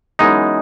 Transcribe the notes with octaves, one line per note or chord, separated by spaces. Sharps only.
F#2 E3 G#3 B3 D#4